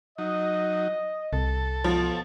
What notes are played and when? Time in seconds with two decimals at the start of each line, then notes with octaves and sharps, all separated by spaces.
0.18 F#3 D#4 D#5
1.33 C2 A4
1.84 B2 F3 F#3 F4